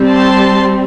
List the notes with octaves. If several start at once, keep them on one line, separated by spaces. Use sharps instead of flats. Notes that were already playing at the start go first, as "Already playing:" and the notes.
Already playing: G3 C4
A5 C6